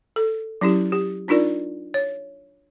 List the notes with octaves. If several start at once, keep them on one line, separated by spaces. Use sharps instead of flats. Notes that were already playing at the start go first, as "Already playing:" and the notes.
A4
F#3 C#4 E4 G4
G4
D4 D#4 F4 A#4 D5
C#5